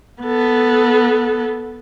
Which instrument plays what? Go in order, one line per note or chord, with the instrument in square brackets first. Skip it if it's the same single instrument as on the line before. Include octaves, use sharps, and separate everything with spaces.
[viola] B3 A4